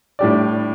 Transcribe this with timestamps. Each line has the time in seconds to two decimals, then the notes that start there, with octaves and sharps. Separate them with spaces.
0.19 A2 G3 D4 G4 D5